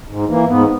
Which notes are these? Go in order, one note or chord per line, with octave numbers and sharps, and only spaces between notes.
G#2
E3 A#3
G#2 B3